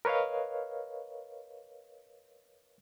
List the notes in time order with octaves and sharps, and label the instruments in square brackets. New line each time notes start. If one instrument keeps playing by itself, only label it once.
[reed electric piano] A#4 B4 C#5 D#5 F5